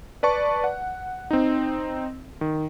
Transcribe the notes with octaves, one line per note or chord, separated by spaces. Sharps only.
B4 D5 A5 C#6
F#5
C4 D#4
D#3